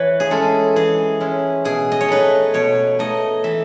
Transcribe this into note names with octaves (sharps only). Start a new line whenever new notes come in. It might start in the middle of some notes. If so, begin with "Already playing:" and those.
Already playing: E3 B4 C#5
G#4
G#3 C#4 E4 A4
E3 G#4
G#3 C#4 E4
B2 G#4
D#5
C#5
A3 D#4 B4
B2 C#5
A3 D#4 D#5
E3 E5